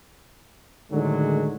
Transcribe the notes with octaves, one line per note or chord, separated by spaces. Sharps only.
A2 D3 D#3 F#3 G#3